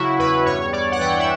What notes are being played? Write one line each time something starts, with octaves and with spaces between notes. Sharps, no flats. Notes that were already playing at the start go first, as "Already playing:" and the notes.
Already playing: C#3 F#3 E4 F#4
E2 B4
G2 C#5
G2 D5
F#5
E3 G5
E5